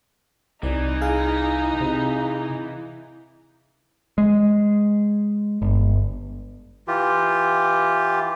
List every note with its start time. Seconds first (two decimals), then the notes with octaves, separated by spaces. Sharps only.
0.63 C2 E3 D#4 D5
1.01 G#4 F5 G#5
1.80 C3
4.18 G#3
5.62 G1
6.88 E3 F4 G4